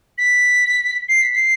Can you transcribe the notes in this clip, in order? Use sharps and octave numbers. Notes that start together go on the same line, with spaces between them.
B6
C7
B6
C7